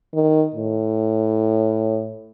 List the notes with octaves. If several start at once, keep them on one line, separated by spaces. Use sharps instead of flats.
D#3
A2